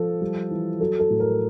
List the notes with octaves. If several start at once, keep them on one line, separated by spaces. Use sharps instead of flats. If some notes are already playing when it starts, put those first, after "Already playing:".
Already playing: F3 A4
G3
E3
F#3 A4
A4
A2
A#4